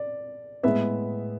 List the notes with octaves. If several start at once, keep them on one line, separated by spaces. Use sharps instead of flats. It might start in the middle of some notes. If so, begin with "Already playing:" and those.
Already playing: D5
A2 G#3 B3 E5